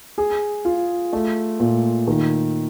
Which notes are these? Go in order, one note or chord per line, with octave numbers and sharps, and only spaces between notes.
G#4
F4
A3
A#2
D#3